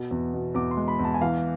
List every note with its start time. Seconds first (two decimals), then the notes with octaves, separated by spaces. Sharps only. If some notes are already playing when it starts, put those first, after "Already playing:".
Already playing: B2
0.11 E2
0.34 B2
0.54 E2 D6
0.71 C6
0.77 G#3
0.88 B5
0.99 E2
1.04 A5
1.14 G#5
1.21 E3 F5